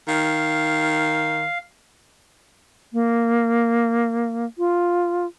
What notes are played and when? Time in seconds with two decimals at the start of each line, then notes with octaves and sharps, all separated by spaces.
0.08 D#3 F5
2.93 A#3
4.58 F4